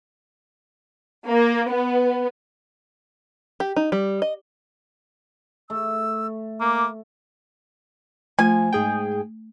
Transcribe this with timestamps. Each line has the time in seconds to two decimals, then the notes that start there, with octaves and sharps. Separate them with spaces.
1.27 A#3
1.69 B3
3.60 G4
3.76 D#4
3.92 G3
4.22 D#5
5.70 A3 E6
6.61 A#3 D6
8.39 F3 A3 G#5
8.73 G#2 G#4 G5